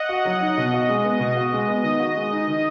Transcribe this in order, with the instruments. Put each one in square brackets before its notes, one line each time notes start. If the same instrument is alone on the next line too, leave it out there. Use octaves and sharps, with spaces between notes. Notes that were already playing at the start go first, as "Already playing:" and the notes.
Already playing: [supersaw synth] D#5 F#5
[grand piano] F#4
F#3
D#4
[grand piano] B2 [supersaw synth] D#5
[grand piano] F#4
G#3
B3
[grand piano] B2 [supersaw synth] D#5
[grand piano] F#4
G#3
B3
[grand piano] D#3 [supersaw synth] D#5
[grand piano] F#4
G#3
D#4
D#3